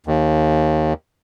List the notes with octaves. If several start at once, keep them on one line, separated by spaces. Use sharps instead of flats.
D#2